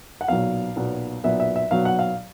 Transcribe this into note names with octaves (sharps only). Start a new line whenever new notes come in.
F#5
B1 A#2 F#3 B3 F5
B1 A#2 F#3 B3
B1 A#2 F#3 B3 E5
E5
E5
B1 A#2 F#3 B3 F5
F#5
F5